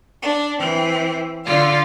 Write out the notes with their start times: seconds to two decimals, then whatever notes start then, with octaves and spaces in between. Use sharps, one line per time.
0.21 D4
0.58 E3 C4
1.44 D3 F4 D5 F5